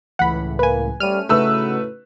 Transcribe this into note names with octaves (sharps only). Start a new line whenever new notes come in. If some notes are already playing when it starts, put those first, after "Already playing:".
C#2 A2 E3 F#5 B5
A#3 B4 G#5
G3 A3 C#4 F6 D#7
A2 C#3 A3 D#4 F#4 B4 E6